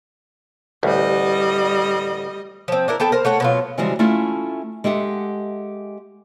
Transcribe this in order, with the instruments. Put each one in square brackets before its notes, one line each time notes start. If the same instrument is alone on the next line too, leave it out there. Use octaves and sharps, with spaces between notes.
[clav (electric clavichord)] A1 D2 [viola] G3 D#5
[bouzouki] F3 C4
D4 E4 A#4
B3 A4 G5 A5
A#4 C5
A3 C#5 F#5
B2 F#3 F4
[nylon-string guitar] C#3 E3 F3 G3 G#3 F#4
A3 C#4 E4 F4 A4
G#3 G4 A4 E5 F#5